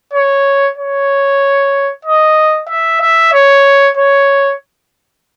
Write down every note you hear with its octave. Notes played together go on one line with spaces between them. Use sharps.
C#5
C#5
D#5
E5
E5
C#5
C#5